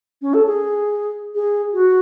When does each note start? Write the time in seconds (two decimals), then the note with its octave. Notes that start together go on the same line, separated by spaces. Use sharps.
0.22 C#4
0.34 A4
0.47 G#4
1.35 G#4
1.73 F#4